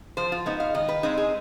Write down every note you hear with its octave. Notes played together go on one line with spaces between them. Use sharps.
F3 C5
F4
G#3 B3 D#4
F5
D#3 D#5
B4
G#3 C4 D#4 G#4
G#4